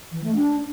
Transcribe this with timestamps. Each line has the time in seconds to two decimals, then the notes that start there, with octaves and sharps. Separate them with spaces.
0.12 E3
0.24 A3
0.35 D4